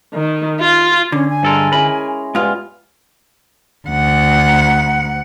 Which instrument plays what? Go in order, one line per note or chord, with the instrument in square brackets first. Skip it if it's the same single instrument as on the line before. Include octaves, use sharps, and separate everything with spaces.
[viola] D#3
F4
[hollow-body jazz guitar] D3 [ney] C#4
[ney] G#5
[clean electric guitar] G2 A4 A#4 [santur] G#3 C5
[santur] C#4 E4 G#4 [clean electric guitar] A#4 B5
[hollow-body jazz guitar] G#2 F4 [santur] G3 B3 G#4
[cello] D2 F#5